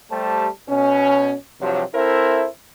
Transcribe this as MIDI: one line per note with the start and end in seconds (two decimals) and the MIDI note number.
0.11 0.48 55
0.11 0.48 57
0.11 0.48 67
0.11 0.48 72
0.11 0.48 81
0.69 1.34 47
0.69 1.34 61
1.61 1.83 43
1.61 1.83 48
1.61 1.83 53
1.61 1.83 54
1.95 2.47 60
1.95 2.47 64
1.95 2.47 69
1.95 2.47 70
1.95 2.47 72
1.95 2.47 76